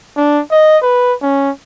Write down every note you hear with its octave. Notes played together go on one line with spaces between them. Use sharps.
D4
D#5
B4
C#4